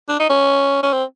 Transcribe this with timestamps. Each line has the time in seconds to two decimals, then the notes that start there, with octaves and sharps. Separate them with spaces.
0.09 D4
0.20 D#4
0.30 C#4
0.83 C#4
0.93 C4